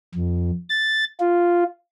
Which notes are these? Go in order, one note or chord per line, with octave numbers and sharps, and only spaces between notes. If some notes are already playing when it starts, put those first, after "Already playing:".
F2
A6
F4